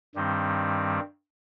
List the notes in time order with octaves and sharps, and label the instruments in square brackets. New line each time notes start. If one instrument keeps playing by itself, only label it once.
[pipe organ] G2 D#3 G3 C4